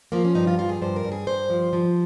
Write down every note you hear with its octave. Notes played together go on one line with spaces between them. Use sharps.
F3 A#3
C#4
G2 D#4
F4
F3 F4
G#4
G2 C5
A#4
G2
G#4
G2 C5
F3
F3